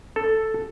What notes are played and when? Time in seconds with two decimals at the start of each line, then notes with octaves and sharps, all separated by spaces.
0.16 A4